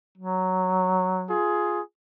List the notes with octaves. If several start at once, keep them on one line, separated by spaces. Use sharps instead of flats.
F#3
F4 G#4